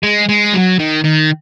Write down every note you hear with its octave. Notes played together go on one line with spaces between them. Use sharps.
G#3
G#3
F#3
D#3
D#3